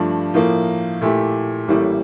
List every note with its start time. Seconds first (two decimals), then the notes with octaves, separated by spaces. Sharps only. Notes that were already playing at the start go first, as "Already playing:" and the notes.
Already playing: G2 F3 A3 D4 F4
0.34 A2 F3 A#3
1.01 A#2 A3 E4 G4
1.68 A1 A2 G3 A#3 E4